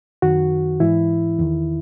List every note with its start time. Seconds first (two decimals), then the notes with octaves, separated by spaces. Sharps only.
0.22 F#2 D#3 F#4
0.80 G#2 E3 E4
1.39 E2 D#3